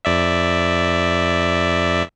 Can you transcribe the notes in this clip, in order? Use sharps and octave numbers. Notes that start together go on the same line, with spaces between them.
F2 D5 E5